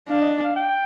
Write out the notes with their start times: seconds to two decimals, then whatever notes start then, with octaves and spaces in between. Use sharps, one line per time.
0.09 D4 F5
0.21 D#5
0.44 F5
0.56 G5